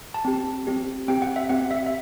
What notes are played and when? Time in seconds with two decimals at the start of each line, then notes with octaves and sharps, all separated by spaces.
0.14 A5
0.25 C4 G4
0.67 C4 G4
1.08 C4 G4 G5
1.22 F#5
1.36 E5
1.49 C4 G4 F#5
1.71 E5
1.86 E5